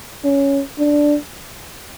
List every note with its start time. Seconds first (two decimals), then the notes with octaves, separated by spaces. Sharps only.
0.24 C#4
0.79 D4